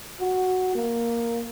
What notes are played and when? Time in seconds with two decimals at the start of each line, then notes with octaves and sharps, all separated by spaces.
0.21 F#4
0.75 A#3